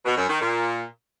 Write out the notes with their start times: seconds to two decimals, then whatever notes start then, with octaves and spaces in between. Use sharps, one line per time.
0.05 B2
0.17 F#2
0.29 D#3
0.41 A#2